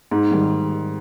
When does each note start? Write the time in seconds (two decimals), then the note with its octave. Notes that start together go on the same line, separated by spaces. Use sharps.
0.11 G#2
0.31 D#3 G3